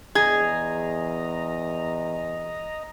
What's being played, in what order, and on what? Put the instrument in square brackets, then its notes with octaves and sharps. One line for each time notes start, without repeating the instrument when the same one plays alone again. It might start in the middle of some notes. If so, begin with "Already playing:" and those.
[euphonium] E2 [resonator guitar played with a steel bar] G#4 [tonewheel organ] D#5 A#5 [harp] G#6